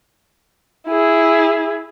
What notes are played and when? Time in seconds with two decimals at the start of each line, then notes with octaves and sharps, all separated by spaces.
0.88 E4 G#4